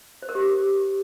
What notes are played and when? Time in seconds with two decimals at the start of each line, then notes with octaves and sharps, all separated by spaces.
0.22 C5
0.29 A#4
0.35 G4